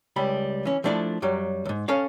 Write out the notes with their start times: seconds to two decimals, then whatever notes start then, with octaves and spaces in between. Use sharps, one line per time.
0.16 C#2 G3 B5
0.65 E3 C#4
0.84 F3 A3 D4 E4 D5
1.22 F#2 F#3 G3
1.65 D#2 G#2
1.88 C#4 A4 C#5 F5